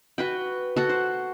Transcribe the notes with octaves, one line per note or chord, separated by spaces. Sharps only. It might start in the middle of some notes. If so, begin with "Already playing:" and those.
F#4 B4 G5
F#4 A4 F#5
C5